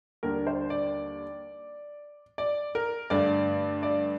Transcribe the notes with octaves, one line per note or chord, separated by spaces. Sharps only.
D#2 D3 G3 A#4
C5
D5
D5
A#4
G2 D3 A3 D5
D5